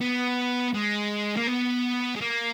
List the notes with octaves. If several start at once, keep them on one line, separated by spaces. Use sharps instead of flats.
B3
G#3
A#3
B3
G#3
A#3